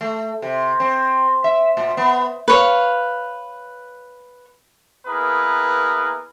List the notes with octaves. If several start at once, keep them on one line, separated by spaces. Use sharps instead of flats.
A3
C3
C4
E5
A#2
B3
B4 C#5 F5
A#3 B3 E4 G#4 A#4 B4